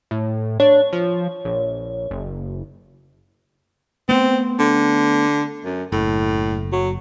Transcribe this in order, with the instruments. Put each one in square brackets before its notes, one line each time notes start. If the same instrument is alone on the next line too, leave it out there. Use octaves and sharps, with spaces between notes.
[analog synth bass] A2
[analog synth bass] D4 [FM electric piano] C#5
[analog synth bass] F3
A#1
F#1
[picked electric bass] A3 B3 [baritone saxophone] C4
[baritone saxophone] D3
F#2
[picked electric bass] F#1 [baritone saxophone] A2
[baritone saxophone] F#3